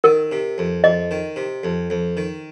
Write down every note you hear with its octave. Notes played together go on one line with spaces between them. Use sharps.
D#3 A#4
C3
F2
F2 D#5
D#3
C3
F2
F2
D#3